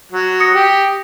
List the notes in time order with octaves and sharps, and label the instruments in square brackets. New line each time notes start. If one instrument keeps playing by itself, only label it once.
[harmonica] F#3
[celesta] D#6 A#6 C#7
[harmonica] G4